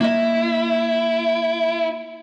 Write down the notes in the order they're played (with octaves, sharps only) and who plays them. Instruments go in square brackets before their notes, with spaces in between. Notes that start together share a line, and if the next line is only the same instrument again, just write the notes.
[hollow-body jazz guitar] A#3 D#5 [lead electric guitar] E4